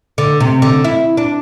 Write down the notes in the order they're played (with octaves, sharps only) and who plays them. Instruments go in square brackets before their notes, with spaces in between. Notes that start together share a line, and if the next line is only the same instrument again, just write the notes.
[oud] D3
C3
D3
E4
D4